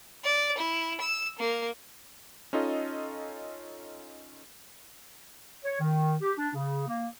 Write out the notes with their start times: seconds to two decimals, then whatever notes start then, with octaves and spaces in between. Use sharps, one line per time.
0.24 D5
0.58 E4
1.00 E6
1.39 A#3
2.53 C#4 D#4 F4 A4 D#5
5.65 C#5
5.81 D#3
6.22 G4
6.38 D4
6.54 C#3
6.88 A#3